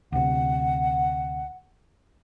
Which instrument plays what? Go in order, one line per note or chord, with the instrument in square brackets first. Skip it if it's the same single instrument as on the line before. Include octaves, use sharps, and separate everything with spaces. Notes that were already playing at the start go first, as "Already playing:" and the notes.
[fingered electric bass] D2 C3 [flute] F#5